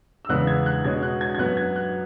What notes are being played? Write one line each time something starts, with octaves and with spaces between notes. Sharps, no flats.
E6
E2 C#3 G#3 B3 F#6
G#6
F#6
B2 G#3 C#4 G#6
F#6
G#6
G#6
F#2 F#3 B3 F#6
G#6
F#6